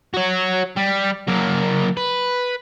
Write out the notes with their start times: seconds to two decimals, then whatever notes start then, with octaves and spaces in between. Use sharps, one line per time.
0.14 F#4 C#5
0.77 G3
1.28 F#3 A#3
1.97 B4